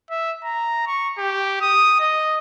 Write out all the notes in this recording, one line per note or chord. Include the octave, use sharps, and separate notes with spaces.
E5
A#5
C#6
G4
D#6
D#5